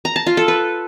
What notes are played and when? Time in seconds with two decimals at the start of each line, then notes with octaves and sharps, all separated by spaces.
0.05 A#5
0.16 A5
0.26 F4
0.37 A4
0.48 B4